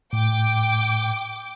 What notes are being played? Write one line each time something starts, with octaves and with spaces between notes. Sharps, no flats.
A2 G5 D6